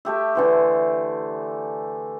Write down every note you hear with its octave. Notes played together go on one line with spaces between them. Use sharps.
A3 G4 E5
D3 E3 C5